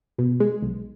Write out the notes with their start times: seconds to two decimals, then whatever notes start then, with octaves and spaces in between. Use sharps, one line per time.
0.18 B2
0.40 G#3
0.62 B1